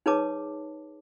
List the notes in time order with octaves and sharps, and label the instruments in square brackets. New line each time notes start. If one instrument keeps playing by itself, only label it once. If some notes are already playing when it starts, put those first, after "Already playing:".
[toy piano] D#4 G#4 B4 C#5 A5 D6